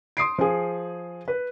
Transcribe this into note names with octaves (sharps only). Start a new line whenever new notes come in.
C6 D#6 C7 D7
F3 G#4
B4